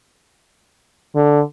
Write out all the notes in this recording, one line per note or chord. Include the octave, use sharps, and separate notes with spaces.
D3